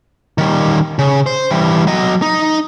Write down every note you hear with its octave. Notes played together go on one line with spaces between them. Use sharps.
D#3 G3
C#3
C5
E3 G3
F#3 D#5
D#4